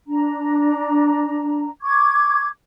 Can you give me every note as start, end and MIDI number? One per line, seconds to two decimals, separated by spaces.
0.07 1.70 62
0.07 1.70 82
1.82 2.48 85
1.82 2.48 86
1.82 2.48 92